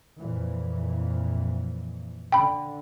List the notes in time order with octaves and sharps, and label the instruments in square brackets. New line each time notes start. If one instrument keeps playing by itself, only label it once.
[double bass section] F2 A#2 E3
[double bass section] D3 [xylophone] G5 B5